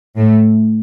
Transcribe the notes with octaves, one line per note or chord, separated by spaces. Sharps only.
A2 A3